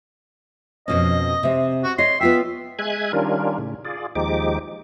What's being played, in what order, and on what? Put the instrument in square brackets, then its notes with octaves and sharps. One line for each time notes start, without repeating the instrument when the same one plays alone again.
[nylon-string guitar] F2 B2 C#4 [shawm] D#5
[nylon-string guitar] C3 C4
[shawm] F#4
[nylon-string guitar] C#5 D#5 [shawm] C6
[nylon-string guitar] B3 F4 G5 [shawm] E5
[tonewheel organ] G#3 E5 G#5 F#6 G#6
D#3 G3 C#4 D4 F4 A#4
A2 C#3
F4 G#4 D5
D#2 F3 G#3 D#4 G4 D6